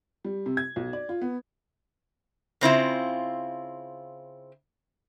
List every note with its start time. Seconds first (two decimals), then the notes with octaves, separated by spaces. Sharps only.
0.25 G3
0.46 C3
0.57 G#6
0.76 B1
0.93 D5
1.09 F4
1.21 B3
2.61 C#3 C4 E4 F4